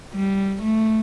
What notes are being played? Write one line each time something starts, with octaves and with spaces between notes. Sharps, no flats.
G3
A3